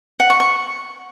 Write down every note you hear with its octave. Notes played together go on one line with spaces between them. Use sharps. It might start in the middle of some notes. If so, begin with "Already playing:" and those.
F#5
C#6
C#6